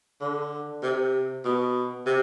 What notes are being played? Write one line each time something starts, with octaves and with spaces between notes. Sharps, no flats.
D3
C3
B2
C3